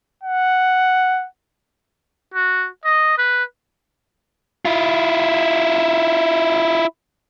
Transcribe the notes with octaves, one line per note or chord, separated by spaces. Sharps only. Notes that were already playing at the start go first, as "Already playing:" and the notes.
F#5
F#4
D#5
B4
E4 F4